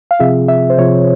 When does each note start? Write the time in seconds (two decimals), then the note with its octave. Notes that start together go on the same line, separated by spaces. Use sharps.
0.11 F5
0.20 C3 F3 C4 F4 G#4 E5
0.48 E5
0.70 C5
0.78 C3 F3 C4 F4 G#4 C#5